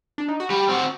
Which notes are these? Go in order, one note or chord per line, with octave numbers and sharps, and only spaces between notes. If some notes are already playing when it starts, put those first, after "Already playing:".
D4
D#4
F#4
G3 G4
C4 F#4